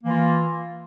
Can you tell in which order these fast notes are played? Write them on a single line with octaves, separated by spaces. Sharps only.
A#3 E3 F4